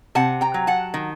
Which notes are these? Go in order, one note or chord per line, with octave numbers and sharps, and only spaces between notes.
C3 F#5 A5
G5 A#5
F#3
F#5 A5
D#3